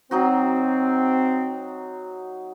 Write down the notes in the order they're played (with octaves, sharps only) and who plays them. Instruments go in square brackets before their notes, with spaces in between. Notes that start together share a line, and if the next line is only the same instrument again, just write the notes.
[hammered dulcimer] F#3 D#4 F#4 [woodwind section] C4